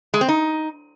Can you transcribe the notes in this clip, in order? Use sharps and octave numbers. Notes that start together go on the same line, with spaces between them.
G#3
C4
D#4